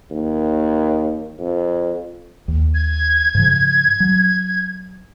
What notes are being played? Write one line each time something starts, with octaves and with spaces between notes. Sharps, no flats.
D#2
F2
D#2
G#6
G#2 C#3 F3
F#3